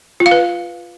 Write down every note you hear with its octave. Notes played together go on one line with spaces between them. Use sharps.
F4
F5
B4